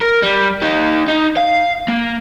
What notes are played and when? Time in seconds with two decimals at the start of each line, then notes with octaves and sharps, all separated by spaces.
0.01 A#4
0.22 G3
0.62 D#4 G4
1.08 D#4
1.37 F5
1.89 A#3